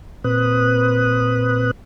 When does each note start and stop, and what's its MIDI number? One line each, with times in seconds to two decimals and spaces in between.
0.24 1.71 46
0.24 1.71 60
0.24 1.71 71
0.24 1.71 87
0.24 1.71 90